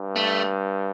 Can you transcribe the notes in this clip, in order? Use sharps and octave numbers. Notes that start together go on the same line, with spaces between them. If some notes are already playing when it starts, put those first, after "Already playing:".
Already playing: G2
A3